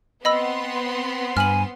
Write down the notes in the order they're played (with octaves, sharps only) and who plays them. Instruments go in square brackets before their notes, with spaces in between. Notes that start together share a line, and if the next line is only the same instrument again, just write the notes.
[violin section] B3 C4 C6 [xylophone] D#5 B5 E6
[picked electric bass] G2 [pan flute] G#5 [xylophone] F6 F#7